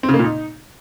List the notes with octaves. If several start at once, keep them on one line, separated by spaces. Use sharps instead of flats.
C4
C#3
A#3
A#2
D#4